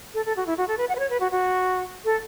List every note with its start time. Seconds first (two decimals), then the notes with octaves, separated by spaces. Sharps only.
0.14 A4
0.26 A4
0.37 F#4
0.46 E4
0.58 F#4
0.68 A4
0.78 B4
0.89 F#5
0.95 B4
0.99 C#5
1.10 B4
1.21 F#4
1.32 F#4
2.05 A4